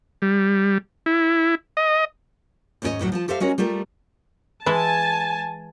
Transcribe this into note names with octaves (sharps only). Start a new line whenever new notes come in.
G3
E4
D#5
D#2 G#2 C#4 E4 C#5 D#5
D2 A2 E3 F#3
F3 F4 A5
G4 A4 C5 E5 F5
G#3 C#4 F#4 A#4 C#5
G3 A3 F4 G4 A#4
E3 G#3 E4 G#5 A5